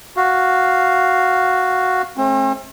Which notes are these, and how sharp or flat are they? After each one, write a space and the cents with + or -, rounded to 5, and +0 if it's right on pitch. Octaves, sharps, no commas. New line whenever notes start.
F#4 +0 F5 +0
A3 -30 C4 +45